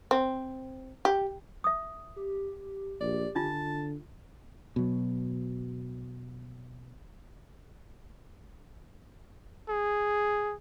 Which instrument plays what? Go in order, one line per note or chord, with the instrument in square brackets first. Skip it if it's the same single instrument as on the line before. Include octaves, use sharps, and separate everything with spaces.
[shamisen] C4
G4
[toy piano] E5 D#6
[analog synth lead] G4
[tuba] A#1 [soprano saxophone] D5
[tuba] D3 [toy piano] D4 F4 [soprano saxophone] A5
[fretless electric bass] B2 F#3
[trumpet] G#4